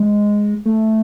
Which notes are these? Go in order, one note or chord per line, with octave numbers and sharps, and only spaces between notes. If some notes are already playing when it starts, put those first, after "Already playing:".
Already playing: G#3
A3